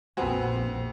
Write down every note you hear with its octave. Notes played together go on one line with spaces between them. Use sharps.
A#1 F2 B3 C4 F#4 G#5